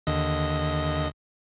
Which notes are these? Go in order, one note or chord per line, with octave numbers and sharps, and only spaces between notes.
D#2 D3 D#5